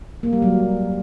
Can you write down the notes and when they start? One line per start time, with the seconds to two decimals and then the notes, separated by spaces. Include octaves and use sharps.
0.23 A#3
0.33 G3
0.42 F#3